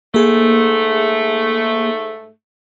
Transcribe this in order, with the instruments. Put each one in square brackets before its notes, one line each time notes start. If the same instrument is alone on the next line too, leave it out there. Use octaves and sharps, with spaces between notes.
[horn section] G#2 A3 [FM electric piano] A#3 G#4